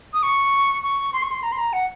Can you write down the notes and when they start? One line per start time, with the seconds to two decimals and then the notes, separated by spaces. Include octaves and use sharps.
0.14 D#6
0.23 C#6
0.83 C#6
1.13 C6
1.22 C#6
1.31 C6
1.43 A#5
1.52 C6
1.58 A#5
1.73 F#5